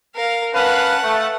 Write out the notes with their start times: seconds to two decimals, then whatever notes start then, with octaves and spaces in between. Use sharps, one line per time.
0.15 A#4 F5
0.54 C#4 B4 F5 F#5 A5
1.03 A3